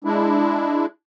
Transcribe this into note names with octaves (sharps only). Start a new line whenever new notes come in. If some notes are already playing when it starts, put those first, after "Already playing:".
G#3 D4 E4